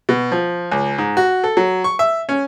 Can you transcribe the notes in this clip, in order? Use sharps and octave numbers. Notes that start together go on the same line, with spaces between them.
B2
F3
C#2
G#2
F#4
A4
F#3
C#6
E5
C#4